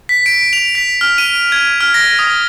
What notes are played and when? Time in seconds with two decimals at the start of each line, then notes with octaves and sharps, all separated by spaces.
0.09 B6
0.26 D7
0.53 F7
0.75 B6
1.01 F6
1.18 D#7
1.52 G#6
1.81 F6
1.94 A#6
2.19 D#6